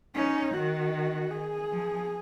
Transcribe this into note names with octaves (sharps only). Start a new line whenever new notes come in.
C#4 D#4
D#3 F#4
G#4
F3